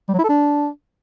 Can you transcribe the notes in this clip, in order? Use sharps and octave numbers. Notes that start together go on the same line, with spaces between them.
G3
F#3
E4
A4
D4